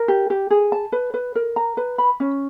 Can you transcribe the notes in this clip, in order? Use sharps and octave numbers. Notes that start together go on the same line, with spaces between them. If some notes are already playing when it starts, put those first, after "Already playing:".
Already playing: A#4
G4
G4
G#4
A5
B4
B4
A#4
A#5
B4
B5
C#4